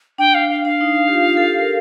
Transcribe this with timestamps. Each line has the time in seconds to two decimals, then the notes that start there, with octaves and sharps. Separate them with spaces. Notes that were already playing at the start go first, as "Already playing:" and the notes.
0.18 D4 G5
0.34 F5
0.50 F5
0.65 D4 F5
0.81 D#4
1.08 G4
1.12 F4
1.37 A4
1.43 G4
1.59 A#4